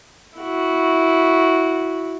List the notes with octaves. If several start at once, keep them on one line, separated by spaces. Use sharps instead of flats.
E4 F#4